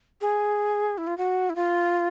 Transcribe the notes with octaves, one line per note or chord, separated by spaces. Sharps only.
G#4
E4
F4
F#4
E4
F4